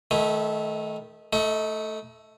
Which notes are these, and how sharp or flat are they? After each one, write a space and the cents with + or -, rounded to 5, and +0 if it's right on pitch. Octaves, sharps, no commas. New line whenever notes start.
D#3 +5 A3 -25 E4 +0
A3 +0 D#4 +35